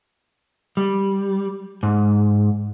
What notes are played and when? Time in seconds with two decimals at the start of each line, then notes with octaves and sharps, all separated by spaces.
0.77 G3
1.83 G#2